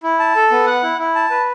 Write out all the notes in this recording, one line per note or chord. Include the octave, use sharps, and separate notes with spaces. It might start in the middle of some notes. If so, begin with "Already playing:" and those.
E4
A5
A4
B3
F#5
E4
E4
A5
B4